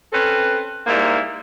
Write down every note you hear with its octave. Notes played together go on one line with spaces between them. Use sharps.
C4 C#4 A4 B4
G#2 G3 A#3 E4